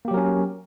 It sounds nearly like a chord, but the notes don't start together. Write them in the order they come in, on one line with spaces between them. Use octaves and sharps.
A#3 G4 F#3 A#4 C#4